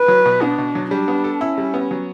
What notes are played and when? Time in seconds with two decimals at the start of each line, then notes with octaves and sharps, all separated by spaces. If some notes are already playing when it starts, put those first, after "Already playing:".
Already playing: B4
0.08 F#3
0.26 B2
0.41 B3 D4
0.58 B2
0.75 F#3
0.91 G3 D4
1.08 B3
1.24 A4
1.41 C#4 E4
1.58 G3
1.74 B3
1.91 F#3